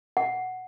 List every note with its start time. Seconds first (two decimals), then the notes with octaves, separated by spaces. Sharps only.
0.17 F#5